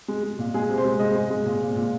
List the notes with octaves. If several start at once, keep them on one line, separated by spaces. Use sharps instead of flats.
G#3
G#3
A#2
G#3 G#4
C3
C5
G#3
G#3 D#5
G#3
G#3
A#2
A#2
A#2